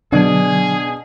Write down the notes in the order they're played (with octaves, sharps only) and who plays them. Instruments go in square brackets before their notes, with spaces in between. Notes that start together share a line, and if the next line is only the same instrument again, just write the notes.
[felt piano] B2 [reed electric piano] D3 F#3 [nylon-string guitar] D4 [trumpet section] G#4